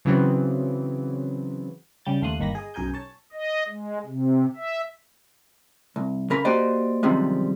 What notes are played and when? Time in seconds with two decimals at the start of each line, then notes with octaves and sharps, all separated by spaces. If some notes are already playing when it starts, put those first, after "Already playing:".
0.05 C#3 E3 F#3 B3 C4
2.05 C#3 G3 G6 A6
2.22 D#2 A3 F5 C6 D#6 F#6
2.39 G1 D#3 A#3 B5 A#6
2.55 G#4 D#5
2.74 B1 F#2 G#4 A#4 G#5 G6
2.94 C#5 A5
3.33 D#5
3.68 G#3
4.06 C3
4.56 E5
5.96 C2
6.30 C#3 A#4 B5
6.45 A#3 F#4 G4 C5 D5 D#5
7.03 F#2 C3 D#3 F3 G3 G#3